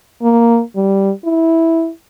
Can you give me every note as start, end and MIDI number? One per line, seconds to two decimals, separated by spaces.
0.22 0.61 58
0.76 1.11 55
1.25 1.90 64